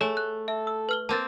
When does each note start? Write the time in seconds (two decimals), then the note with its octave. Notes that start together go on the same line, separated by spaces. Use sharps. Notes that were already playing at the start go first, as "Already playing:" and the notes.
0.01 A3 G#4 C#5 G#5
0.17 F#6
0.48 A4 E5
0.67 E6
0.89 B4 F6 G7
1.09 A#3 C4 A5 A6